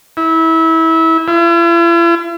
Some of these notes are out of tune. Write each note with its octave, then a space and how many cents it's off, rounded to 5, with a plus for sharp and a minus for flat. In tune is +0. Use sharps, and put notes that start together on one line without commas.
E4 -25
E4 +45